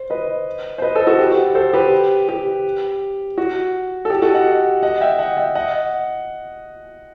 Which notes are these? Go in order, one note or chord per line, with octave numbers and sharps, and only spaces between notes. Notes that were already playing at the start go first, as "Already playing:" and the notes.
Already playing: C5
B4 D#5
C5
B4 D#5
A4 C5
F#4 A4
G4
F#4
A4 C5
G4 B4
G4
F#4
A4
G4
F#4 A4
D#5 F#5
D#5 F#5
E5 G5
D#5 F#5
E5 G5
D#5 F#5